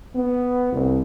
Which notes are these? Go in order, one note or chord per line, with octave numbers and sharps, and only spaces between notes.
B3
C2